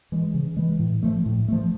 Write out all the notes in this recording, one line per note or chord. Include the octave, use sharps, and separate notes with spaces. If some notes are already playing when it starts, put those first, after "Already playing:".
E3 G#3
C#3
E3 G#3
A2
F3 A3
A2
F3 A3